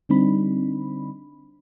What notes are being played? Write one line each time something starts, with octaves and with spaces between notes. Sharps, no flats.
D3 G3 C4 D4 D#4 B5